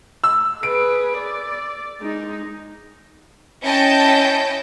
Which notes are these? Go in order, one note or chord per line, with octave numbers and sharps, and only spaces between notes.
E6
G#4 B4 D7
D5
G#3 D#4
C#4 E4 D#5 G5 A5 G6